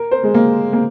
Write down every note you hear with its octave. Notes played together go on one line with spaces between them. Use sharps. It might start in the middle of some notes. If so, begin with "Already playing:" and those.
Already playing: A#4
C5
G#3
A#3
A#3